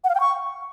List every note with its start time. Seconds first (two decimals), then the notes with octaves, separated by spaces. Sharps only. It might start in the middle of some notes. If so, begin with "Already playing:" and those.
0.04 F#5
0.10 F5
0.15 G5
0.20 C#6